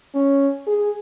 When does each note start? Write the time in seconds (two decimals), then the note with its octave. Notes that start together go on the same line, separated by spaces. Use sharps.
0.15 C#4
0.67 G#4